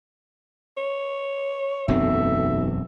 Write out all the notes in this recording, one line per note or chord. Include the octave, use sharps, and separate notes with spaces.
C#5
E1 B1 F#2 A3 C4 E5